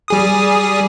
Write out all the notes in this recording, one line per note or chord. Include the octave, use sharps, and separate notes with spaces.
G3 G#4 D#6